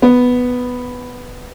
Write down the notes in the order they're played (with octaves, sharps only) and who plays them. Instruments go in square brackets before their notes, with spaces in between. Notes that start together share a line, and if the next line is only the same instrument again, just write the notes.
[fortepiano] B3